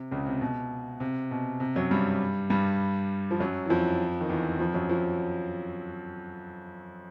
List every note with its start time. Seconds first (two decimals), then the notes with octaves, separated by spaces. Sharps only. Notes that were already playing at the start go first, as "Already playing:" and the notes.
Already playing: C3
0.11 C#2 C#3
0.26 C3
0.41 B2
1.00 C3
1.31 B2
1.60 C3
1.76 F#2 F#3
1.91 G2 G3
2.50 G2 G3
3.31 F3
3.40 F#2 F#3
3.66 E3
3.70 F2 F3
4.21 D#3
4.29 E2 E3
4.59 F2 F3
4.74 F#2 F#3
4.89 F3